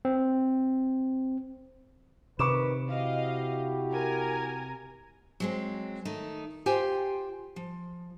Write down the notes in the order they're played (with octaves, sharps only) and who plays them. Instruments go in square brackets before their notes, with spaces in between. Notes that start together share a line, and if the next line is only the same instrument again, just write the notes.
[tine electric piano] C4
[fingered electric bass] C3 [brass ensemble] D#3 B4 [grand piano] C#6 D6 E7
[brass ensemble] E4 F#4 G4 [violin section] D#5 F5
[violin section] A#4 G#5 A#5
[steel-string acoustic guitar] F#3 G#3 C4
D#3 A3 D#4
F4 G4 C5 G5 G#5
F3